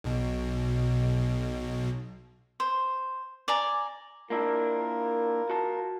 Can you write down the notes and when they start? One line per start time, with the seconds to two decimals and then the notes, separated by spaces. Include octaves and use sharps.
0.04 B1 B2
2.60 C5
3.48 D5 G#5 A#5
4.30 A#3 D4 E4 F4 A#4
5.50 F#4 A5